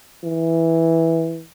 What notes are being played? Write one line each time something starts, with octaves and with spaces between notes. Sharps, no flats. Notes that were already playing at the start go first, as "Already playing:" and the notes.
E3